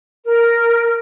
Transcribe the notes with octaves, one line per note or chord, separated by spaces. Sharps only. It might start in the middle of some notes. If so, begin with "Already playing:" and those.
A#4